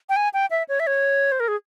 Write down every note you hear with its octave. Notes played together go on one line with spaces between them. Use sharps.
G5
G#5
G5
E5
C#5
E5
C#5
C5
A#4
G#4